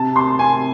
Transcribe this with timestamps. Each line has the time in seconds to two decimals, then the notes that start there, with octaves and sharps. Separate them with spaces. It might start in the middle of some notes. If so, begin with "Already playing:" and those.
Already playing: C3 A5
0.16 C6
0.39 C3 G#5